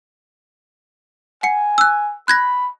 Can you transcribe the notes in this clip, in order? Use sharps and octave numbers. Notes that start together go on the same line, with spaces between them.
F#5 G#5 C#7
E6 F#6
B5 F#6 G#6 A#6